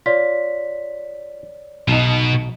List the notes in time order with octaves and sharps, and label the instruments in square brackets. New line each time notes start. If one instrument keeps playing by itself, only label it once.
[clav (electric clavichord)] F4 [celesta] C#5 D5 B6
[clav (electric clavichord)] B1 D#4 [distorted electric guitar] B2